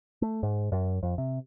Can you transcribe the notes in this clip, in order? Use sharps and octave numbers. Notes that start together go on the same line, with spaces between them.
A3
G#2
F#2
F2
C3